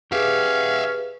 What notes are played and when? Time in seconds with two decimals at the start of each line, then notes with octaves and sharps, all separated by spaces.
0.12 C#4 G4 G#4 B4 E5 F5